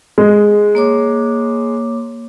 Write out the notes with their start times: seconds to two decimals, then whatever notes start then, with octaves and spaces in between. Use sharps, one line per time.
0.18 G#3
0.75 A#3 C#5 D6